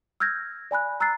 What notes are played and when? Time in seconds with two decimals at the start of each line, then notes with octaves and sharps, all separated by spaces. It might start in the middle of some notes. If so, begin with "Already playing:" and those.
0.20 E6 F6 G6 G#6 A#6
0.71 D5 G#5 B5 F#6
1.00 A#5 E6 F#6 A6 C7